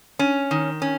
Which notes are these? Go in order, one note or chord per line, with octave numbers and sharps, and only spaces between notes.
C#4
D#3
C#4